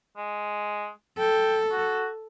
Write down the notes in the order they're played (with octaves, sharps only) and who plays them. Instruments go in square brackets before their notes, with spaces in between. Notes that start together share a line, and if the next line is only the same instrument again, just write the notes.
[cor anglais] G#3
[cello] A4 [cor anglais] G5
[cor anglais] F#4